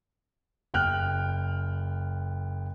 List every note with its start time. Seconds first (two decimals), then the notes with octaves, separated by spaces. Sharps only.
0.74 F#1 G5 F6 F#6